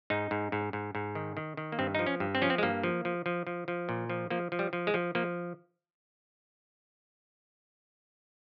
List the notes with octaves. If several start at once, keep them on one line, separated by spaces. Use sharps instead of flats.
G#2 D#4
G#2
G#2
G#2
G#2
D#3
D#3
D#3
A#3
G2 C4
F3 D#4
C#4
G2
C4
F3 C#4
C4
G#3
G2 A#3
F3
F3
F3
F3
F3
A#2
F3
F3 A#3
F3
G3
F3
G#3
F3
F3 A#3